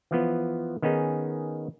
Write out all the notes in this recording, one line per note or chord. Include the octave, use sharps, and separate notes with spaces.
E3 F3 B3
D#3 B3 C#4 D#4 G#4